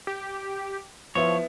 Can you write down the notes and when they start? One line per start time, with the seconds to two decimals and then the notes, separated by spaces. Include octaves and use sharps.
0.07 G4
1.15 F3 B3 E4 C#5